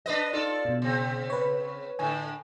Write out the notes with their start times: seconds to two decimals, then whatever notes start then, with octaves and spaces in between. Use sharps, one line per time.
0.06 D4 B4 D#5
0.33 D#4 F4 A4 D5
0.65 B2
0.82 C#3 C4
1.30 B4 C#5
1.99 A2 D3 G#5